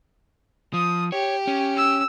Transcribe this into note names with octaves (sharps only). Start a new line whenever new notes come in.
F3 D#6
G4 C#5
C#4
E6